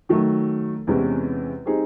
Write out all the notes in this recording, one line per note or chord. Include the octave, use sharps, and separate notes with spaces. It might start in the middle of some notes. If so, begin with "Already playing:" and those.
D#3 F#3 A3
E2 C3 E3 G#3 C#4
G3 C4 D#4 G#4